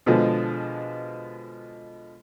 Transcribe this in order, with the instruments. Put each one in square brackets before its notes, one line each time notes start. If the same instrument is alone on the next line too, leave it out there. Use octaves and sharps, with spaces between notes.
[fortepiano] B2 D3 F3 G#3